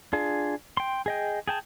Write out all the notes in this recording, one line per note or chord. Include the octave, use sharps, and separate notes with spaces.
D4 F4 G#4
G5 C6
G#4 D#5 G5
G#4 G5 A5